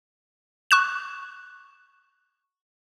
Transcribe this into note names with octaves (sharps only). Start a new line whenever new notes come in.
C#6 F#6 E7